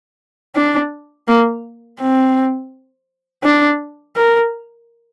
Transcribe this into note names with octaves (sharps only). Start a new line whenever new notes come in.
D4
A#3
C4
D4
A#4